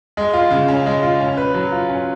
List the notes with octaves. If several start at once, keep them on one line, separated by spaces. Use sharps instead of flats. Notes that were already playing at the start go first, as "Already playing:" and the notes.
G#3
F4
C#3
C#4
G#3
F4
C#4
B4
F#3
F4
C#4